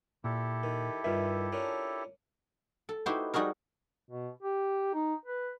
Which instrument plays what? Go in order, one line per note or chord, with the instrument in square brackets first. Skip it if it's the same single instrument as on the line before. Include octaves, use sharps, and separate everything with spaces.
[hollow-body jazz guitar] A#2 [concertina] E4 G4 A4
[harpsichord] D#3
[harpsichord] G2 D#3 [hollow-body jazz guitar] F4 E5
[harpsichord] C#4 D4 A#4
[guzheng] A4
D#4 E4 F#4 G4 B4 C5
G3 D#4 F#4 G#4 A#4
[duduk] B2
G4
D#4
B4